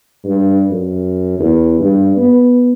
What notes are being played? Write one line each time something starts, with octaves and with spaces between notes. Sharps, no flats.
G2
F#2
E2
G2
B3